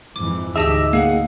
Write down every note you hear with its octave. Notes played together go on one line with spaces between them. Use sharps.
F2 G#2 E3 D6
D2 D#4 G4 G#4 D#5 E5 A5 E6
A#3 G#4 F5 F#5